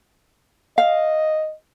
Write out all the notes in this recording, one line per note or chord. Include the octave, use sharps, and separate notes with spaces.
D#5 F5